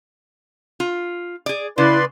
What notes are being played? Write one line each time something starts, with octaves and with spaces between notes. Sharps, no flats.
F4
G#4 D5
C#3 E4 B4 D5 C6